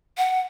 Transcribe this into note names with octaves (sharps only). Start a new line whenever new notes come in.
F#5